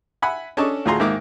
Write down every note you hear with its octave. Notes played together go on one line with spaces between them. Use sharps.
E5 F#5 G#5 B5
C#4 D4 A4 D#5 A5 C#6
D2 A2 F4 G#4 A#5 C6
G#2 D#3 A#3 E5 D6